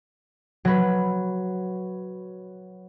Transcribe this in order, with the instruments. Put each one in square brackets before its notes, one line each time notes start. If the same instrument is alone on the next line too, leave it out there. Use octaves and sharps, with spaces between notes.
[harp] F#3 B4